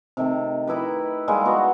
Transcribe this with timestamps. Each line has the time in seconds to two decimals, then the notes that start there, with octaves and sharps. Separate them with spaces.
0.17 C3 D#3 A3
0.67 D#4 E4 G4 B4
1.28 G3 G#3 A#3
1.45 B3 F#4 F#5 A#5